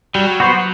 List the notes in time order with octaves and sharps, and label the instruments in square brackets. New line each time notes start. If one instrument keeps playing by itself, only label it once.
[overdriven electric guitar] F#3 [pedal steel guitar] G3
[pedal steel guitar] B3 F#4 C5